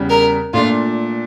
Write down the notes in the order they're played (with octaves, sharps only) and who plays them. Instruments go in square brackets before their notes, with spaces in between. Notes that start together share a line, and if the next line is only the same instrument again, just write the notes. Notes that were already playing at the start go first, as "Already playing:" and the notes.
Already playing: [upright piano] E2 C#3 G3
[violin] A#4
[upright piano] A#2 A3 D4 [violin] F4